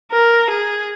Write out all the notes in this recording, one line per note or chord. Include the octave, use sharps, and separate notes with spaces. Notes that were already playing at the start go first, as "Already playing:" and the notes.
A#4
G#4